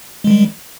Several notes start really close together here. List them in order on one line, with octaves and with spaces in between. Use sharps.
G#3 D#3 G3